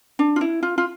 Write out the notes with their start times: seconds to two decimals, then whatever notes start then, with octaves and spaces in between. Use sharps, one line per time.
0.19 D4
0.36 F4
0.41 E4
0.63 F4
0.78 F4